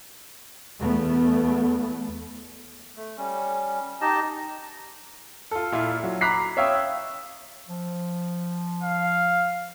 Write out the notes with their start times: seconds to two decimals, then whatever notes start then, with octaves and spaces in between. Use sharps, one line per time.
0.78 E2 A3 B3
2.97 A3
3.17 G3 C#4
4.01 D#4 G4 D#5 A5
5.51 F4 A4
5.72 A#2 E4 F4
6.03 F#3
6.21 A#5 B5 D6 F#6 B6 C7
6.57 C#5 E5 F5 G5 D#6 E6
7.69 F3
8.83 F5